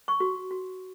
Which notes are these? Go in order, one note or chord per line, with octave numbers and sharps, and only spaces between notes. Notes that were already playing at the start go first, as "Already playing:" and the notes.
C#6
F#4
F#4